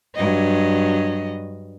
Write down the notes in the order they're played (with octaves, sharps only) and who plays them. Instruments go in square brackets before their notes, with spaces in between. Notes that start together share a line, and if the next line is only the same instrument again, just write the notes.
[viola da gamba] G2 F#3 D#5